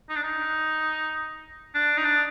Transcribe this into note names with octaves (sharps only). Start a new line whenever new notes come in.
D#4
D4
D#4
D4
D#4
D4